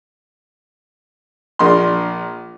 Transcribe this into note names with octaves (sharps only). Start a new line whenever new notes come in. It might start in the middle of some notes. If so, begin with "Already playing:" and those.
A#1 A#3 D4 C6